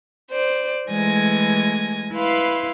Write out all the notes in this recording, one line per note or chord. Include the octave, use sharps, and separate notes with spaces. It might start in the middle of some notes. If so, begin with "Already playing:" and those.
C5 D5
E3 G#3 A3 G#5 G#6 A#6
E4 B4 F5 C6